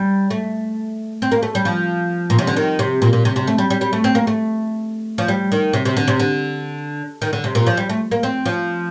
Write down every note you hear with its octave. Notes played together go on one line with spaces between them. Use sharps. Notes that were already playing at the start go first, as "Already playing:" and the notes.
Already playing: G3
A3
C4
A#3
A3
G3
F3
A#2
C3
D3
D#3
C3
A#2
A#2
C3
C3
A3
G3
G3
G3
A3
C4
A#3
A3
F3
G3
D#3
C3
C3
D3
C3
D3
D#3
D3
C3
A#2
F3
G3
A3
A#3
C4
F3